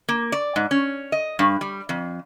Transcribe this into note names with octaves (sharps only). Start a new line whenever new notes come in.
A#3
D5
G#2
C#4
D#5
G2
G3
F2